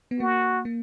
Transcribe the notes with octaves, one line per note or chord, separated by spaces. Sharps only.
B3
A#3 F#4
A#3